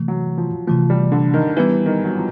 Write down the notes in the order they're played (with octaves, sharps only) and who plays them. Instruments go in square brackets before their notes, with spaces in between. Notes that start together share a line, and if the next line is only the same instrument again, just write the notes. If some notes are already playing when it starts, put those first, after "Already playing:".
Already playing: [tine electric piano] C3 E3 A3
[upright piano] F#3
F3
[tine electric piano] C3 E3 A3 [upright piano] F3
[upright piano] G3
D3
D#3
[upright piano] E3 [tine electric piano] G3 B3 E4 G4 B4
[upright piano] D#3
F#3
F3